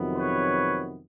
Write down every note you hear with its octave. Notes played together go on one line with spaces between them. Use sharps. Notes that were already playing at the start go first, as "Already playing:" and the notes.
Already playing: F2 C3 D#3 F#3 B3
B4 C#5